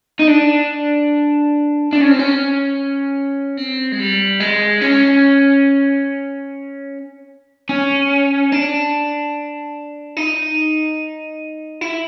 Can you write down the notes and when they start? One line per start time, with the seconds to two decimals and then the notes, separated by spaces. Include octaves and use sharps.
0.20 D#4
0.28 D4
1.93 D4
2.01 C#4
2.10 C4
2.19 C#4
3.57 C4
3.92 G#3
3.99 G3
4.40 G#3
4.81 C#4
7.69 C#4
8.52 D4
10.17 D#4
11.81 E4